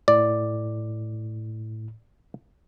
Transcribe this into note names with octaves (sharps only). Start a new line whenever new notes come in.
A2 D5